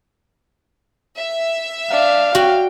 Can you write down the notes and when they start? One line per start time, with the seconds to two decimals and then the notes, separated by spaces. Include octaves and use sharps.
1.16 E5
1.91 D4 F5
2.35 F#4 G5